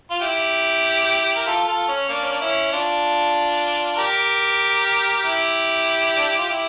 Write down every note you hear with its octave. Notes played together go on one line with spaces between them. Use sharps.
F4
E4 G4
A#4
F4 A4
F4 A4
C#4
A#3 D4
C#4
D4
C#4 E4
D4 F4
G4 A#4
E4 G4
D4
E4
F4
E4 G4